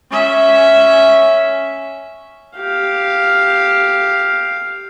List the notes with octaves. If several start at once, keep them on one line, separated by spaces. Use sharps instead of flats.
C#4 E5
G4 F5